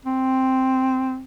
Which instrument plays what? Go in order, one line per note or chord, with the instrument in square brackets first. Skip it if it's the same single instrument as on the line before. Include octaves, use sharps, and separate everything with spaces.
[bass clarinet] C4